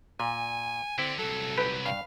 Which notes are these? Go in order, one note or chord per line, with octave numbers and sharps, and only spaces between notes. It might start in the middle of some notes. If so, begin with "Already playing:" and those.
A#2 G#5
D3 C4 E4
C2 F#3 A4
G4 B4
G2 F5